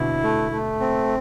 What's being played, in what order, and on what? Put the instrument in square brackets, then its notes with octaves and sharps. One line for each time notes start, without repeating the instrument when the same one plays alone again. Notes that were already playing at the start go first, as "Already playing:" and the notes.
Already playing: [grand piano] B2 D3 [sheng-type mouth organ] E4
[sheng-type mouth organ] A3
A3
C4